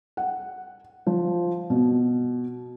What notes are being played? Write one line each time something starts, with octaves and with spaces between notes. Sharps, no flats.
F#5
F3
B2